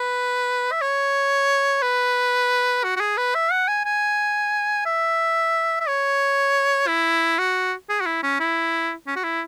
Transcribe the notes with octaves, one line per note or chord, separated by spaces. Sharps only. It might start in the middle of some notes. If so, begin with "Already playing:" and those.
Already playing: B4
E5
C#5
B4
F#4
F#4
G#4
B4
E5
F#5
G#5
G#5
E5
E5
C#5
E4
F#4
G#4
F#4
E4
C#4
E4
C#4
F#4
E4